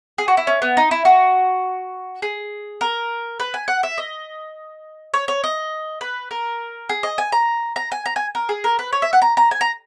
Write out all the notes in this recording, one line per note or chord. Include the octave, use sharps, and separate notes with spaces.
G#4
F#4
E4
C#4
B3
D#4
E4
F#4
G#4
A#4
B4
G#5
F#5
E5
D#5
C#5
C#5
D#5
B4
A#4
G#4
D#5
G#5
A#5
A#5
G#5
A#5
G#5
A#4
G#4
A#4
B4
C#5
E5
F#5
A#5
A#5
G#5
A#5